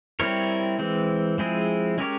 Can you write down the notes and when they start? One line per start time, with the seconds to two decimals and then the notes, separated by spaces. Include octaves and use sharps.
0.20 G3 C4 E4 A#4 C#5
0.79 E3 G#3 C4
1.38 F3 G#3 C4 E4 G#4
1.98 G#3 C#4 G4 A#4 C#5